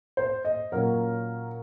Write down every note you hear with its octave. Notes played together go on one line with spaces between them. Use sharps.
C5
D#5
A#2 F#3 A#3 C#4 A#4